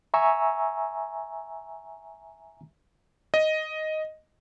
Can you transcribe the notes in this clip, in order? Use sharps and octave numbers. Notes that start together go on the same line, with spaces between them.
E5 G#5 A#5 C#6 E6
D#5